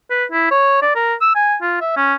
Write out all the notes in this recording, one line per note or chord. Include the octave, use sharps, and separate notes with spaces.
B4
E4
C#5
D5
A#4
E6
G#5
F4
E5
C#4